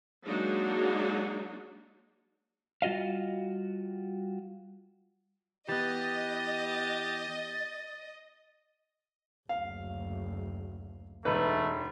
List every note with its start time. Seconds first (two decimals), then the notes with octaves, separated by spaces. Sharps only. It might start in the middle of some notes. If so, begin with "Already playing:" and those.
0.25 F#3 G#3 A#3 D4 D#4 F#4
2.82 G3 F4 F#4 D#5 F5
5.69 E3 B3 G4 D#5 A6
9.49 F#1 D2 F5
11.25 E1 E2 A3 D#4 B4